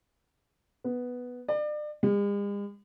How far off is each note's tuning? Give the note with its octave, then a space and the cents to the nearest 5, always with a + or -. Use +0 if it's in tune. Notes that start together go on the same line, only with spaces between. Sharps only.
B3 +0
D5 +35
G#3 -45